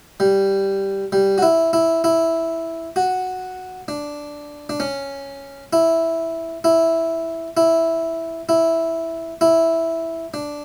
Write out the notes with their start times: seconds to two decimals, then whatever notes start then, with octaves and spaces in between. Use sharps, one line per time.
0.20 G3
1.12 G3
1.38 F#4
1.42 E4
1.73 E4
2.04 E4
2.96 F#4
3.88 D4
4.69 D4
4.80 C#4
5.73 E4
6.64 E4
7.57 E4
8.49 E4
9.41 E4
10.34 D4